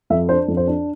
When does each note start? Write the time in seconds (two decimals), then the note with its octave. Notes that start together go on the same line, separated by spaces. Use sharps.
0.10 F2 E5
0.29 D4 C5
0.48 F2
0.57 C5
0.67 D4